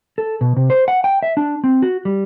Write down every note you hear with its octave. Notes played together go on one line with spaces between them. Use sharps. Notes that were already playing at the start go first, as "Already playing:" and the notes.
A4
B2
C3
C5
F#5
G5
E5
D4
C4
F#4
G3